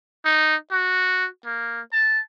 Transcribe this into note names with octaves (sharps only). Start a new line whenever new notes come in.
D#4
F#4
A#3
A5